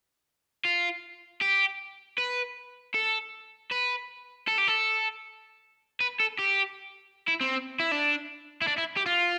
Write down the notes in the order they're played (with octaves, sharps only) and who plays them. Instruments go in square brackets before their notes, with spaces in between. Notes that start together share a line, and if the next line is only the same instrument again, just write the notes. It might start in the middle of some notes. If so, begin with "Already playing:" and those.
[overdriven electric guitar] F4
G4
B4
A4
B4
A4
G4
A4
B4
A4
G4
E4
C4
E4
D4
E4
D4
E4
G4
F4